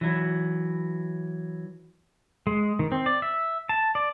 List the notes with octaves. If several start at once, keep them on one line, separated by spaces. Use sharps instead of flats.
E3 F#3
G#3
D#3
C4
D5
E5
A5
D5